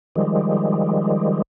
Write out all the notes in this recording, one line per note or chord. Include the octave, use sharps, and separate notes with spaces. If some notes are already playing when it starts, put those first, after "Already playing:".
D#3 F3 G3 G#3